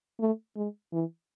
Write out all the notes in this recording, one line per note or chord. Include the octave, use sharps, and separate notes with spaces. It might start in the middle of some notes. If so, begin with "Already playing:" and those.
A3
G#3
E3